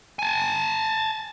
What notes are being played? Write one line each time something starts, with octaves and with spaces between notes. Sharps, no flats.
G#5 A5